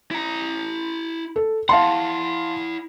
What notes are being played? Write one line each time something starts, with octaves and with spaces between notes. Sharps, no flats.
E4 A#5
A4
E4 F5 F#5 A5 C6